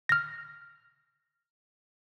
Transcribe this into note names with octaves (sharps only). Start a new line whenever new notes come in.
F6 A#6